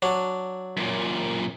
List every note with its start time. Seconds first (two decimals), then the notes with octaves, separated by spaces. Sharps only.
0.02 F#3 D4
0.77 F#2 A#2